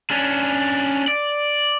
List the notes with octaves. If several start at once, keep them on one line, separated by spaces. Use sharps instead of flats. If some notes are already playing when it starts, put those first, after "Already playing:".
C#4 D4
D5